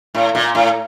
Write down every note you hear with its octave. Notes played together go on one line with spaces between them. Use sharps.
A2
A#2
A2